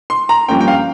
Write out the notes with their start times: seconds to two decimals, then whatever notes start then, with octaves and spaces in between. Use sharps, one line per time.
0.10 C6
0.29 A#5
0.49 G2 F3 A#3 C#4 G5
0.61 G5
0.68 F5